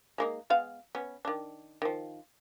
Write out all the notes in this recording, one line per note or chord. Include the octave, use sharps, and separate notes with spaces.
G#3 A#3 D#4
G#3 B3 F5
B3 C#4
D#3 D4
D#3 F3